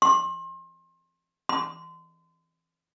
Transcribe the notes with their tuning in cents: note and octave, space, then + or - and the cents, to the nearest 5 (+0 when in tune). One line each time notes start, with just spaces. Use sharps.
C6 +35
C6 -30